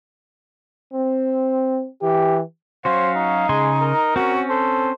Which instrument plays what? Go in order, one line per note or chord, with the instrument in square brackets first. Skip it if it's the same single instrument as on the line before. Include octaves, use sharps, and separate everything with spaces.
[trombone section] C4
E3 G4
[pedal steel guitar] F#3 C#4 F#4 [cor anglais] C5 [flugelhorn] F5
[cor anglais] D#4
[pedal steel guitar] C#3 G#5 C6 [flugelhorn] G#3
[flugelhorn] A#4
[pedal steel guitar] C4 C#4 [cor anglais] F#4
[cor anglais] A4 [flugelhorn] C5